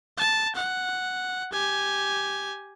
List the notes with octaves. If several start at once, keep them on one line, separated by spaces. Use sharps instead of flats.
A5
F#5
G4 G#5